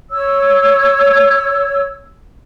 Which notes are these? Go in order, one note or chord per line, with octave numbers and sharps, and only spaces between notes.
C#5 E6